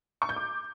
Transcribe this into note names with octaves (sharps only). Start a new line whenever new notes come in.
C#6
G6
D6